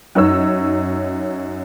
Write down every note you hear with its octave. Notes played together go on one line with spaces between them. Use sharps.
F#2 D#4 C#5 E6